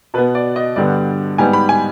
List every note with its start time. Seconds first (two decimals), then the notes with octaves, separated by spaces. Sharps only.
0.14 B2 B4
0.18 B3
0.35 D5
0.56 D#5
0.76 G2 D3 G3 B3 D5
1.38 G#2 G3 B3 G#5
1.53 B5
1.69 G#5